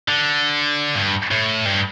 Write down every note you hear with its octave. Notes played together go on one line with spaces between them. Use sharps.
D3
G2
A2
G2